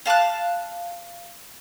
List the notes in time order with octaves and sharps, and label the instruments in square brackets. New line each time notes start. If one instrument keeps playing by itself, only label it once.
[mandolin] F5 A5 D6 F#6